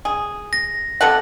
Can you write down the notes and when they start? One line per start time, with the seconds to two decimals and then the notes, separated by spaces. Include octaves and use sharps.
0.05 G#4
0.53 A#6
1.01 C3 A4 F#5